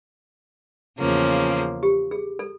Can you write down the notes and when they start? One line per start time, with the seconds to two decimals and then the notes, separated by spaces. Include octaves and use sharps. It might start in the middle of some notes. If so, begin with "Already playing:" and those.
0.98 E2 C#3 F3 A#3 C#4
1.83 G4
2.11 G#4
2.39 A4